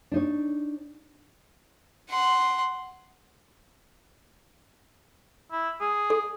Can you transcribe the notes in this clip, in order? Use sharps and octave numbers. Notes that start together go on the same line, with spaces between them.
D4 D#4 C#5
F#5 C6
E4
G#4
A4